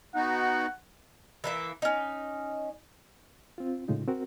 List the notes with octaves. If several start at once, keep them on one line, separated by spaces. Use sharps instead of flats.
B3 D#4 F#4 F#5
E3 A#3 E5
C#4 D#4
C4 F4
A2 C#3 G#3 D#4 F4
C4 F#4 A#4